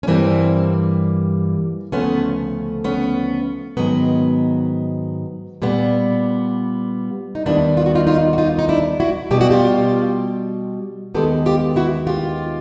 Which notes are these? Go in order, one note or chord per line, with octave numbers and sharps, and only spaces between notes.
C#4
G2 E3 G3 A#3 C4
D2 C#3 F3 A3 B3 C#4
B3 C#4
G#2 D#3 F#3 B3
A#2 G3 B3
D#4
D#2 D#3 G3 B3 D4 E4
F4
F#4
D#4 F4
D#4 F4
F#4
D#4 F4
D#4
D4 E4
E4 F#4
B2 G3 B3 G4
F#4
F4 G4
D#2 D#3 G#3 B3 G4 A4
F4 G4
E4 F#4
F4 G4